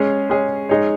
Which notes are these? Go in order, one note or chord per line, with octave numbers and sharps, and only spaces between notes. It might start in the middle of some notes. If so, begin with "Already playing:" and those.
Already playing: G#3 C#4 G#4 C#5
G#3 C#4 G#4 C#5
G#3 D#4 G#4 C#5